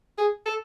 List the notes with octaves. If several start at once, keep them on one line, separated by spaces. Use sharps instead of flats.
G#4
A4